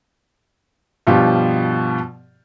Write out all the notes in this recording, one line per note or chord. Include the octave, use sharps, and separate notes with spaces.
G2 B2 F3 F4 G4